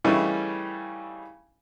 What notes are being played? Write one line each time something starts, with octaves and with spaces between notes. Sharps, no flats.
C#3 E3 G3 A3 C#4 D#4